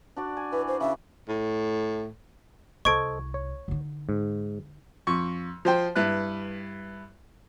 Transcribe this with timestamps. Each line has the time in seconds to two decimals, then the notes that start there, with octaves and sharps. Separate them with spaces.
0.17 D4 F#4 D5
0.37 G#5
0.53 E3 B4
0.68 C5
0.80 C#3 E5
1.29 A2
2.85 C2 A4 C5 D#5 C#6 G#6 D7
3.34 C#5
3.68 D3 D#4
4.09 G#2
5.07 F2 C#6
5.65 F3 C5 G5
5.95 G2 E4 B4 F#6